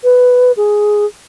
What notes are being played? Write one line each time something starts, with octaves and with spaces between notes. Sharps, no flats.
B4
G#4